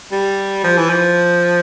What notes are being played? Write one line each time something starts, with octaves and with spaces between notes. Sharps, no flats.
G3
F3
E3
F3